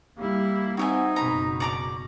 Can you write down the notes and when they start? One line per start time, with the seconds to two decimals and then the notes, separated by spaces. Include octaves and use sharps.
0.17 G3 A#3 E4
0.77 C4 D#4 F#4 E5 G#5
1.16 F#1 B2 A#5 B5
1.60 D5 A#5 D6